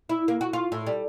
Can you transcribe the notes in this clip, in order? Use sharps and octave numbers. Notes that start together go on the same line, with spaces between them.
E4
A#3
F#4
F4
A2
G3